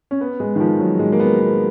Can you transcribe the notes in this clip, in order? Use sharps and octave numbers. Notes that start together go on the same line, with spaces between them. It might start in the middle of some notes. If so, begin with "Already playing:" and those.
C#4
B3
G#3
D#3
F3
F#3
G#3
A#3
B3
B3